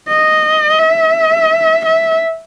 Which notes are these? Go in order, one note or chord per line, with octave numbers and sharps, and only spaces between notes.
D#5
E5
E5